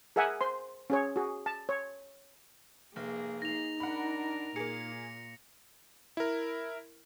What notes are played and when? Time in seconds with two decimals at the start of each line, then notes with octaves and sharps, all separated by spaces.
0.16 G#4 A#4 E5 F#5 G#5
0.41 C5 C6
0.90 C#4 G#4 C#5
1.16 F#4 G#4
1.46 A5
1.69 C#5
2.96 F1 A#3 G#4
3.42 D#4 A#6 F7
3.80 D4 A#4 F#5 B5
4.56 A#2 A#3 G#4 C#7
6.17 E4 A#4